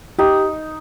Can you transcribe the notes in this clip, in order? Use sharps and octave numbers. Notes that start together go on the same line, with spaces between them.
D#4 G4